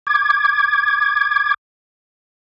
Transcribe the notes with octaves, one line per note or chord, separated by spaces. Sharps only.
D6 G#6